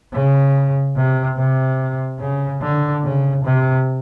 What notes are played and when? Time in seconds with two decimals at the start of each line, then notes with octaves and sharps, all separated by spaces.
0.13 C#3
0.96 C3
1.37 C3
2.19 C#3
2.62 D3
3.03 C#3
3.44 C3